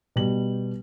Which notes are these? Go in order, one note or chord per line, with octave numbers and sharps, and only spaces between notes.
B2 G3 F#7